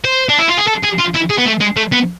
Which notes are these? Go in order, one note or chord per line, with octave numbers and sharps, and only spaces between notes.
C5
D4
E4
F4
G#4
A4
G#4
F4
E4
G#4
B3
A3
G#3
A3
B3